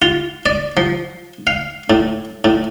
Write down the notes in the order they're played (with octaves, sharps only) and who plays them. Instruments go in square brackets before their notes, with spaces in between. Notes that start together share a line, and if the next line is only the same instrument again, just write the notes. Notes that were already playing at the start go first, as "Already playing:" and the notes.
[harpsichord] F4
D5
F3
F5
A2
A2